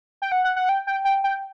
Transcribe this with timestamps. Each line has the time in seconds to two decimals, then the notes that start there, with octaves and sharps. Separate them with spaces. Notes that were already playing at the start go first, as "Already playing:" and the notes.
0.22 G5
0.32 F#5
0.44 F#5
0.56 F#5
0.69 G5
0.87 G5
1.05 G5
1.24 G5